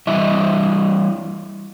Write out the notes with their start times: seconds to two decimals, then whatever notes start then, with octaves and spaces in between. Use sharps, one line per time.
0.07 E3 G3 E4 D#5 E5